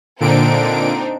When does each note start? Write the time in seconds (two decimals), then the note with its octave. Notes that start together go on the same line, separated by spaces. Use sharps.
0.20 A#2 D3 C4 D4 D#4 D7